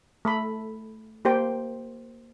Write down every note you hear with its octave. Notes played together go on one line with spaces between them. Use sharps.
A3 A4 B5
A#3 G4 C5 G5